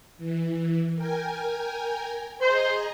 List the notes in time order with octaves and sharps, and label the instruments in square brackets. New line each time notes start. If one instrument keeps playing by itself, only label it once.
[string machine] E3
A#4 G5 G#5
[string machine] G#4 D#5 A#5 [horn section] C5